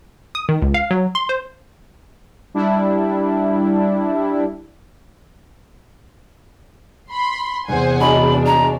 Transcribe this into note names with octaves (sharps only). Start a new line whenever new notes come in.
D#6
D#3
C#2
F5
F#3
C6
C5
G3 D4 E4
B5 C6
E2 C3 C5 F#5 G#5
F#3 G#3 D4 B5
A#5